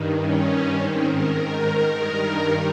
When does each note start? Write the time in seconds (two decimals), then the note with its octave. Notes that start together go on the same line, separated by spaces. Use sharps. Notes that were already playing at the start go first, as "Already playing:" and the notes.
Already playing: G2 D#3
0.16 C#4
0.74 G#2 D#3 C4
1.03 A#4
1.33 A#4
1.91 G2 D#3 A#4